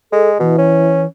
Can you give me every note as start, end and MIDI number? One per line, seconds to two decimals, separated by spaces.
0.12 0.36 56
0.12 0.31 69
0.40 0.53 47
0.40 1.05 52
0.58 1.03 61